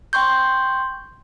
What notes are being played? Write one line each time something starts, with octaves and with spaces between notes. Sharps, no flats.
G5 C6 C#6 G6